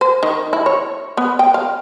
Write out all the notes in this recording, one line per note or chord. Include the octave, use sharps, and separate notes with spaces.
C5
D#3
E4
C#5
B3
G5
F5